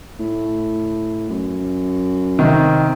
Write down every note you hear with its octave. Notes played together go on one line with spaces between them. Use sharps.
A2
F#2
C3 D#3